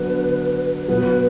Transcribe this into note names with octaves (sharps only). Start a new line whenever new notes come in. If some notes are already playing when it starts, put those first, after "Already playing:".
Already playing: D3 F#3 B3 B4
B2 F#3 B3 B4